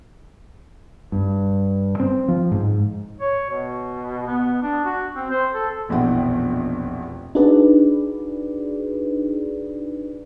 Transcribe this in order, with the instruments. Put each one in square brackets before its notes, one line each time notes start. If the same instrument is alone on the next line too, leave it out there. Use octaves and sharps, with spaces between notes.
[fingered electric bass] G2
C4
F3
G#2
[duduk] C#5
B2
B3
D4
F#4
C4
C5
A4
[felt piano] F1 A#1 B2 E3 F#5 G5
[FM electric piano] D4 D#4 F#4 G#4 B4 D5